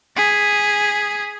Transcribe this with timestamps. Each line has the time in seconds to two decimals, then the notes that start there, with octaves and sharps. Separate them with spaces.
0.16 G#4 B6